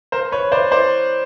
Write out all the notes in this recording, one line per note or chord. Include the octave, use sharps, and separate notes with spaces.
A#4 C5
B4 C#5
C5 D5
C5 D5